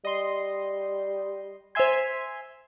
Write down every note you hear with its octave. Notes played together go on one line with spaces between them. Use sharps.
G3 D#5 C6
C5 E5 G#5 C6 G#6